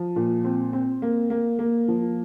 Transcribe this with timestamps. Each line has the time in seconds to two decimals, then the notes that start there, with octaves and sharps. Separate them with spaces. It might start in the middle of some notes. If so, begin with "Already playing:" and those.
Already playing: F3
0.16 A#2
0.44 C4
0.73 C4
1.02 A#3
1.30 A#3
1.59 A#3
1.88 F3